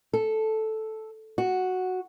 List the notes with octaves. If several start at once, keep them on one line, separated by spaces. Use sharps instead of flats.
A4
F#4